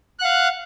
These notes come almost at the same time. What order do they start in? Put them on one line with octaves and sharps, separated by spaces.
F#6 F#5 F5